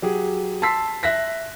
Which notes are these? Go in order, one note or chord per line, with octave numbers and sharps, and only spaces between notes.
F#3 G4 G#4
A5 C6 E6 B6 C7
E5 F#6 A#6 B6